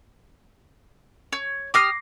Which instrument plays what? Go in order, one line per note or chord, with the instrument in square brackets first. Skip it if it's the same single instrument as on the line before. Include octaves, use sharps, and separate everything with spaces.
[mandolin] C#5
[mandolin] G4 D#6 F6 [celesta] D6 A#6 C7